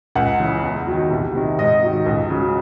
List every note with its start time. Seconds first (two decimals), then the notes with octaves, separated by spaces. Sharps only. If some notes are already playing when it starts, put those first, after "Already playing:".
0.15 C#2 F#5
0.40 C#3 E3
0.64 E2
0.87 D#3 F#3
1.10 C2
1.35 C3 D#3
1.58 G#2 D#5
1.83 D#3 F#3
2.06 C#2
2.30 C#3 F#3